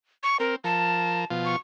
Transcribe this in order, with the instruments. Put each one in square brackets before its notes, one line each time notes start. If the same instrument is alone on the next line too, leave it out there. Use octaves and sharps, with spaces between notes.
[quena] C#6
[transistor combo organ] C4 [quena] A#4
[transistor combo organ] F3 A#4 [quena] A5
[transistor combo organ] B2 F3 F4
[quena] C#6